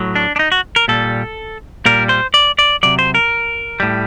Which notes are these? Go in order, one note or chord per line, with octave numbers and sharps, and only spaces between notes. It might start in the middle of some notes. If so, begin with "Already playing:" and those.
Already playing: A2 F#3
D4
D4
D#4
F#4
A#4
A#2 G3 A4
A#2 G3 A#4
C5
D5
D5
C3 F#3 D5
C5
A#4
A2 G3